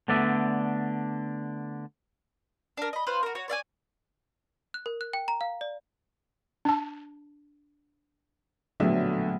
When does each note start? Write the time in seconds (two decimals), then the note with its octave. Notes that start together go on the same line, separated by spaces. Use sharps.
0.08 D3 A3 B3 D4 D5 E5
2.77 D4 A#4
2.93 D#5 B5
3.07 F4 B4 C5 F5
3.23 F#4 A#4
3.35 F#4 C#5
3.48 C#5 D5 F5 G#5
4.74 F#6
4.86 A#4
5.01 F#6
5.13 G5
5.28 A#5
5.41 F5
5.61 D5
6.65 D4 A5
8.80 A#1 D3 F#3 A3 B3 E5